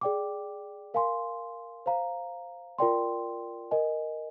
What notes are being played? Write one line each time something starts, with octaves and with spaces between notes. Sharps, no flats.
G#4 D5 G5 D6
A#4 F5 G#5 C6
C5 F5 A#5
F4 A#4 D5 G5 C6
A#4 D#5 G#5